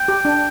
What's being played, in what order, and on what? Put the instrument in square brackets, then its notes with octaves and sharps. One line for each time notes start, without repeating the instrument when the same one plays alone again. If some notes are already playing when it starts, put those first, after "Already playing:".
Already playing: [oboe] G5
[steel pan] G4
D4